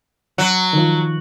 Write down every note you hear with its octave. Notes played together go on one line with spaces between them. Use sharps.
F#3 F#5
D#3 F3